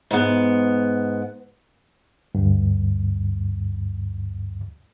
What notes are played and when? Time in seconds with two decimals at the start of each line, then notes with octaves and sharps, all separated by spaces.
0.11 G#2 B3
2.35 D2 G2